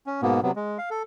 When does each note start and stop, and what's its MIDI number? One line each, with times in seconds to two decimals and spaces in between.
0.07 0.21 61
0.22 0.40 44
0.22 0.40 47
0.22 0.40 58
0.22 0.40 59
0.43 0.51 48
0.43 0.51 54
0.43 0.51 59
0.56 0.78 56
0.78 0.89 77
0.90 1.03 69